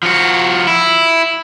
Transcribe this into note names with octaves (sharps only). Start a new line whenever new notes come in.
F3 F#4
E4